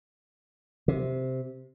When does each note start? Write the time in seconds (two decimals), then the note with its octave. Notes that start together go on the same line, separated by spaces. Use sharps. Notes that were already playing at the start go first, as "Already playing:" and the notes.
0.88 C3